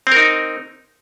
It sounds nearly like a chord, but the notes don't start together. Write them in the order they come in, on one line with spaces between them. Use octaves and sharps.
C4 A#4 D#4